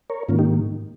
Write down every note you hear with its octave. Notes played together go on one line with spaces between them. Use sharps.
A#4 C#5
G#2 D#3 A#3 C#4 F4
D#4 G4